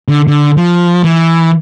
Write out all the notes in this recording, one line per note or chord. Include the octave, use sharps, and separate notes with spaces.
D3
D3
F3
E3